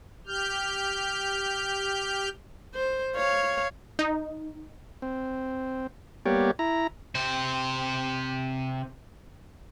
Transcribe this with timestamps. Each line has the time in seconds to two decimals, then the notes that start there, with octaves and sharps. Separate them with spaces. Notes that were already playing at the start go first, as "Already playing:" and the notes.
0.27 G4 F6 G6
2.75 C5
3.16 C#5 F5
3.99 D#4
5.02 C4
6.26 G3 A#3 B3 G4 C#5 D5
6.59 E4 A#5
7.15 C3 C5